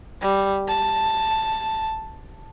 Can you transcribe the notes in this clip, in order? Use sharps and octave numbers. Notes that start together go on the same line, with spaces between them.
G3
A5